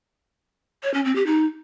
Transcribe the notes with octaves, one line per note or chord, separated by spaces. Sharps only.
C#5
C#4
C4
G4
D#4